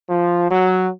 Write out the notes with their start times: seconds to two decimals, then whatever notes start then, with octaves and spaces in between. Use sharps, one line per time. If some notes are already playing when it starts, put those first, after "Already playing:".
0.08 F3
0.50 F#3